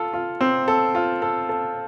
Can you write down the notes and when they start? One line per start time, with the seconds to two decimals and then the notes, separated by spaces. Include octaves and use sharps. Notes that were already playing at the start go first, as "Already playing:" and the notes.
Already playing: F4 A4
0.13 F4
0.41 C4
0.68 A4
0.95 F4
1.22 A4
1.49 A4